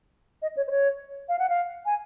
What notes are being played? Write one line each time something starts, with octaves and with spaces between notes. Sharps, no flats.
D#5
C#5
C5
C#5
F5
F#5
F5
G#5